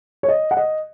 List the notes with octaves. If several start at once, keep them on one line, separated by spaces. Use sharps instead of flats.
C#5
D#5
F#5
D#5